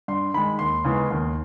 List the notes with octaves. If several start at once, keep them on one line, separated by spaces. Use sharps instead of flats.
G2 C6
D#3 G#3 B5
D#2 C6
C#3 E3 G#3 B3
D#2